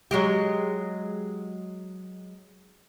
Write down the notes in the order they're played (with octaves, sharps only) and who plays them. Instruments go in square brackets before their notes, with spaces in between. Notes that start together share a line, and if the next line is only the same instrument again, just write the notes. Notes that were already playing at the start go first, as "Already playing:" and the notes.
[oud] F#3 G#3 G4